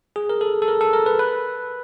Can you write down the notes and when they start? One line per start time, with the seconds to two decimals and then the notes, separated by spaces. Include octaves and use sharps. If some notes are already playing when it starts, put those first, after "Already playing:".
0.16 G#4
0.29 A#4
0.41 A4
0.62 A4
0.68 A#4
0.81 A4
0.93 A#4
1.06 B4
1.19 B4